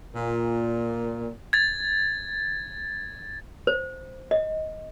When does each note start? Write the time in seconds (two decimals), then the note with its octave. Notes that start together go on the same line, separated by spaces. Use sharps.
0.15 A#2
1.53 G#6 A6
3.67 C5
4.31 D#5